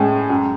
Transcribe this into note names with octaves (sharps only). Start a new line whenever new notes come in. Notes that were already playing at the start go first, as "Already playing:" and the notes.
Already playing: A2 G#3 C#4
F#2